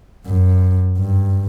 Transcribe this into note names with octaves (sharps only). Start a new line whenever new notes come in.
F#2
G2